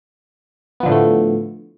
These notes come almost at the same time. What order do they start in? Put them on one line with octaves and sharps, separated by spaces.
B3 F3 D3 A2 A3